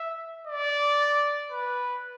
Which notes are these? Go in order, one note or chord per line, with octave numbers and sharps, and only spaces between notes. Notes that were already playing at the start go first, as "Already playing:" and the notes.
Already playing: E5
D5
B4